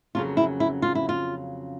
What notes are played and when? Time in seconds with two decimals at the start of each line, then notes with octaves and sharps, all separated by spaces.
0.15 F2 C#3 F#3 A#3 C#4 F4
0.37 E4
0.60 E4
0.82 F4
0.95 E4
1.09 F4